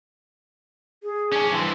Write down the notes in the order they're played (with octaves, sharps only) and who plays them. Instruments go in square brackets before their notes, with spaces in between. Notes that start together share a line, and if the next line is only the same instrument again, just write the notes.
[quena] G#4
[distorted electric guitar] C#4 D4
[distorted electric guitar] G2 E3 [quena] C6